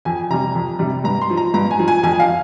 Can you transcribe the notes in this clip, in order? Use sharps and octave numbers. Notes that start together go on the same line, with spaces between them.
F2 G#5
C3 G3 A#5
F2
C3 G3
G2 A#5
C6
F3
A#5
G2 A#5
G#5
F3
G#5
F2 G#5
F5